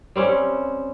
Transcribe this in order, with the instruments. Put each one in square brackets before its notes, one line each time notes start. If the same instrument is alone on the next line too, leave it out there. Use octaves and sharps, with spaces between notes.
[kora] G3 C4 C#4